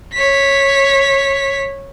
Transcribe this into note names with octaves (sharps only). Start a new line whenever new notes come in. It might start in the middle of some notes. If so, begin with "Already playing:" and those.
C#5 B6